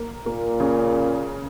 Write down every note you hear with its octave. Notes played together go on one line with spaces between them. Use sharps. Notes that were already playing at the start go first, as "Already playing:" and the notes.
Already playing: A#3
A#2 A#3
C#3